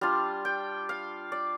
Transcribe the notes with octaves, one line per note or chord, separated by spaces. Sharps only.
G3 D4 F4 F5
G5
F5
D5